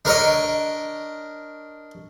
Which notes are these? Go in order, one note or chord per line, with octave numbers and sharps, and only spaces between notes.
D4 A#4 C#5 D#5